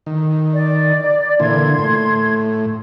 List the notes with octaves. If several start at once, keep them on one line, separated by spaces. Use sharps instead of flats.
D#3
D5
A#2 D3 E3 C6 G#6
A2